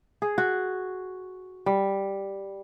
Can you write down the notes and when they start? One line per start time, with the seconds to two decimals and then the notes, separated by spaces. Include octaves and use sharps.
0.22 G#4
0.38 F#4
1.66 G3